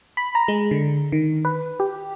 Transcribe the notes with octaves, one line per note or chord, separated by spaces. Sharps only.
B5
A#5
G#3
D3
D#3
B4
G4